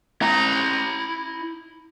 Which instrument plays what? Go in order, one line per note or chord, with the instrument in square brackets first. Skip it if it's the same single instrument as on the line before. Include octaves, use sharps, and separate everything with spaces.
[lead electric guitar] E4 A#5